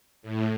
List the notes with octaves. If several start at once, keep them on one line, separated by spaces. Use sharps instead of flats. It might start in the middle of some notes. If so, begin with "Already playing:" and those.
A2